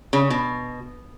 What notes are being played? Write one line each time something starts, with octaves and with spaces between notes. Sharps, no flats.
C#3
B2